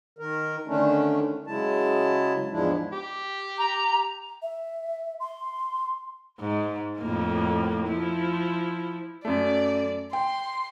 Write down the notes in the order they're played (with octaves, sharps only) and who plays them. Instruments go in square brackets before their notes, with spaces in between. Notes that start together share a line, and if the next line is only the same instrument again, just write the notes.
[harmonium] D#3 A#4
D3 D#3 A3 C#4 D4
C#3 F#3 G#3 E4 A5
E2 G#2 F3 G#3 D4 E4
[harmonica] G4
[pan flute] A#5
[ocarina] E5
C6
[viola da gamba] G#2
F2 A2 A#3
F3 E4
[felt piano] F#2 A3 [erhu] D5
[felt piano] G5 [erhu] C6